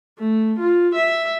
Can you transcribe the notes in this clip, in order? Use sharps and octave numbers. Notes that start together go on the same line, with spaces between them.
A3
F4
E5